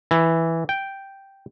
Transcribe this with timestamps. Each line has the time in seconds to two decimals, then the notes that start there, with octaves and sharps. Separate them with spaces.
0.11 E3
0.69 G5